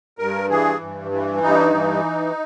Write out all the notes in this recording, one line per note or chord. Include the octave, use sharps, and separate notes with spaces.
G2 A#4
E3 G#4
G2
E3
G2 D#4
E3